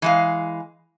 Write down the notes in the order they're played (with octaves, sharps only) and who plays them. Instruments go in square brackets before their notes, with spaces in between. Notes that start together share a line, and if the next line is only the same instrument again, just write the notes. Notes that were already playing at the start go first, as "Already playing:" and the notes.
[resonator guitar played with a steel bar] E3 G#3 F5